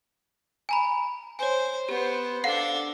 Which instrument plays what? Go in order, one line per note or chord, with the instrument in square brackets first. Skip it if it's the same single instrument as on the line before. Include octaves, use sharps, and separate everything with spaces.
[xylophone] G#5 A#5 B5
[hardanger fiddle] C5 [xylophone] C#5 G#5
[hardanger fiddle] B3 C5 [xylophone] G4
[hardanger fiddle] D4 A4 [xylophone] F5 F#5 C7